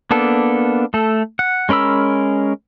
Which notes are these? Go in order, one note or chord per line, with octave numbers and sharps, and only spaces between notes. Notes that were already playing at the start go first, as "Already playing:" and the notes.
A#3 B3 D4 A4
A3 A4
F#5
G#3 C#4 A#4 B5 E6